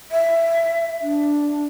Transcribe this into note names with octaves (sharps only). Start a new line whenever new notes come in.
E5
D4